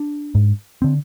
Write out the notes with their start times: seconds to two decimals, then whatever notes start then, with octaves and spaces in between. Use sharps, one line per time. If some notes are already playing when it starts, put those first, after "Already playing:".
Already playing: D4
0.35 G#2
0.82 D3 C4